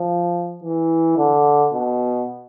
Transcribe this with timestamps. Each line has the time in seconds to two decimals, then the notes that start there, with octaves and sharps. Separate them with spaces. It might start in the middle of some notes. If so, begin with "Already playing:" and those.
Already playing: F3
0.64 E3
1.18 D3
1.73 B2